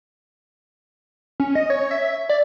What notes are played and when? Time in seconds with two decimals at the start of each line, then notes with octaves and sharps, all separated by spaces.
1.40 C#4
1.55 D#5
1.70 C#5
1.91 E5
2.29 D5